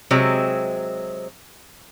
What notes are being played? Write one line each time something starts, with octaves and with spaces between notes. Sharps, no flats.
C3 F#3 G#3 C4